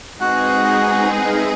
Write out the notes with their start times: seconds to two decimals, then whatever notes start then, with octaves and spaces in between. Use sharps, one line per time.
0.21 G#3 C4 D#4 F#4 G#4 B4 F#5
1.20 F#5
1.29 F5
1.39 E5